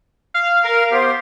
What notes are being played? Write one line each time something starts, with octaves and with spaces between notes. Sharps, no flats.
F5
A#4
B3 G4 C5